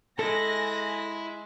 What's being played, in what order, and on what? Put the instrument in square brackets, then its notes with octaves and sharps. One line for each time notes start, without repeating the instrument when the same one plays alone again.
[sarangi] G#3 [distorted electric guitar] E4 [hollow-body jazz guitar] A4 [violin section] A#6